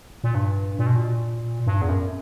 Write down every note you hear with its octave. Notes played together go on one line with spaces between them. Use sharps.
A#2
G2
A#2
B2
A#2
G2
E2
F#2